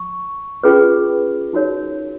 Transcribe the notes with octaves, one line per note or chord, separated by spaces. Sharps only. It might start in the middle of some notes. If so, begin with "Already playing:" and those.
Already playing: C#6
C#4 F4 G#4 B4
D#4 F#4 A#4 C#5